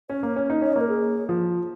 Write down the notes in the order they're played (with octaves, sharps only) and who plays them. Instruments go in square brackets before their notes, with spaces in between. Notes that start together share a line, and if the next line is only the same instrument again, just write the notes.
[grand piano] C#4 [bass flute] C#5
[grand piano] A#3
C#4
D#4
[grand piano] C#4 [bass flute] D#5
[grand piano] A#3 [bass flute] C#5
[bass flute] A#4
G#4
[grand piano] F3